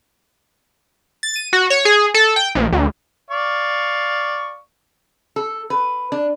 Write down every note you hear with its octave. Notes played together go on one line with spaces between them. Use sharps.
A6
D#7
F#4
C#5
G#4
A4
G5
A#1
D2
D5 F5 C#6
A4
B4
D4